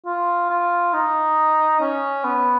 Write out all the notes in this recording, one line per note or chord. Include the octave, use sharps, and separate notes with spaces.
F4
F4
D#4
C#4
B3